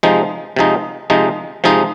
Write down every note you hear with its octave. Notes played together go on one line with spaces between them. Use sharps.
C3 F3 G#3 D#4
C3 F3 G#3 D#4
C3 F3 G#3 D#4
C3 F3 G#3 D#4